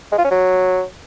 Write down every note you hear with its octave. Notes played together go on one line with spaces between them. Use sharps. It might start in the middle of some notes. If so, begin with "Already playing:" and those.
G#3
F4
C#4
F#3